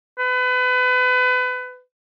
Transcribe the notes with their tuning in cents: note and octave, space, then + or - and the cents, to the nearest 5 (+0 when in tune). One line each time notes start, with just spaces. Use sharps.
B4 +30